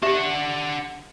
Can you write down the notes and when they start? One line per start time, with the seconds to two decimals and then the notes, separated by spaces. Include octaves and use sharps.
0.02 D4 G4 E5 F#5